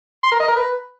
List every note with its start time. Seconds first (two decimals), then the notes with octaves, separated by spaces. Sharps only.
0.23 C6
0.32 A#4
0.40 D#5
0.48 A#4
0.56 B4